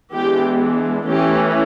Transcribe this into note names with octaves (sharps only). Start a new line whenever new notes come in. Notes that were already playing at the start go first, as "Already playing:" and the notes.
E3 G#3 B3 D4 G4
E3 A3 C#4 G4